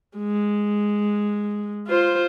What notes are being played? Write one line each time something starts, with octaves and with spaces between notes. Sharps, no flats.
G#3
F4 C5